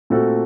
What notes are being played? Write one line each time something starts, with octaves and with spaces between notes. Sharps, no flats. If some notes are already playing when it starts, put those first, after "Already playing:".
A#2 A3 C4 F#4 A4